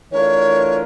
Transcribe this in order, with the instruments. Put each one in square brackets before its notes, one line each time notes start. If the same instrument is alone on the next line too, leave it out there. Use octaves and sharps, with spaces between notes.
[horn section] E3 A3 D4 F4 A#4 [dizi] C#5